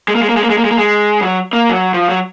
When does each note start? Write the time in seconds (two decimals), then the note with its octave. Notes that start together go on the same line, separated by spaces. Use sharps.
0.08 G#3
0.15 A#3
0.22 G#3
0.29 A#3
0.37 G#3
0.43 A#3
0.50 G#3
0.58 A#3
0.65 G#3
0.71 A#3
0.78 G#3
1.21 F#3
1.53 A#3
1.69 F#3
1.94 F3
2.09 F#3